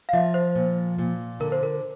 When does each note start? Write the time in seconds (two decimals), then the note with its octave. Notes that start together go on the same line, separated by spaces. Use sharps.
0.09 F5
0.13 F3 E5
0.34 C5
0.55 A#2
0.99 A#2
1.40 D3 A#4
1.52 C5
1.63 A#4